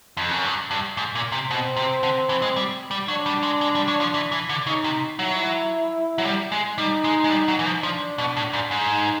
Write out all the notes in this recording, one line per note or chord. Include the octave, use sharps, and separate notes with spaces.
F2
F#2
G2
G2
G#2
A#2
C3
B2 C4
C3
D3
E3
G#3
G3
G3
F#3 D4
G3
G#3
G#3
G3
F#3
F3
E3
E3
D3
C#3 D#4
C3
F#3 E4
F#3
G3
G#3
G3 D#4
G#3
G#3
G3
F#3
E3
F3
F3 D4
B2
A2
G#2
G#2
D#4